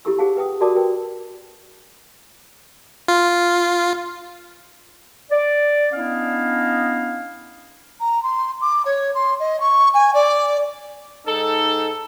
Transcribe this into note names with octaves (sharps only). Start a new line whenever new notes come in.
E4 F4 G4 A4 C#6 E6
G4 G#4 C5 F5 F#5 A5
B4 G5 D#6
F#4 A#4 D5 A5 D6 D#6
A#4 B4 G5
F4
D5
B3 C#4 D4 E4 D#5 F5
A#5
C6
D6
C#5
C6
D#5
C#6
G#5
D5
G#2 D#4 A4